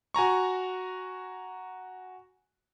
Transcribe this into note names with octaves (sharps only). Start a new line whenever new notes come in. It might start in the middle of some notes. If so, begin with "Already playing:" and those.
F#4 G#5 A#5 C#6